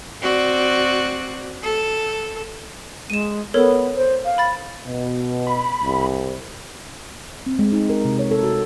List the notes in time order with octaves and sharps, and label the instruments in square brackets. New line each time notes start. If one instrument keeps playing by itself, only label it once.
[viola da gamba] C4 F#4 D5
A4
[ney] G#3 [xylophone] D#7 E7
[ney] B3 [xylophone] A4 A#4 C#5
[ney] C5
F5
[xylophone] B5 A6
[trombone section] B2
[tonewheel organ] B5
[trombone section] C2
[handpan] C4
G#3
D#4
A#4
C3
C#5
A4
F#4